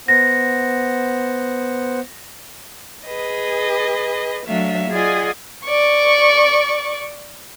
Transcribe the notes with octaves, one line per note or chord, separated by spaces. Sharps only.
B3 C5 F#5 A#6
G#4 B4 D#5
F#3 A3 D4 E5 F5
F4 G#4 D5 D#5 F#5 G#5
D5 C#6